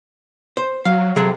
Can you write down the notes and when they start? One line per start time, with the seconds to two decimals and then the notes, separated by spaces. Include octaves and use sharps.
0.57 C5
0.85 F#3 F5
1.16 C3 F#3 G#4 A4